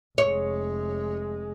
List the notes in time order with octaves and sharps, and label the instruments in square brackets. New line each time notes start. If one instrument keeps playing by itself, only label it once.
[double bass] F1 G#3 [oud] C#5